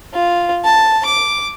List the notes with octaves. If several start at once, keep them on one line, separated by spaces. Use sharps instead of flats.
F4
A5
D6